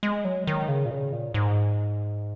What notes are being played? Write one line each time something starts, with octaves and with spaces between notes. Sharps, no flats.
G#3
F#3
D#3
C#3
A#2
C#3
A#2
G#2